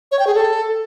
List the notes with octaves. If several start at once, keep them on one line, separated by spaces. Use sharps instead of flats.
C#5
G5
G#4
A4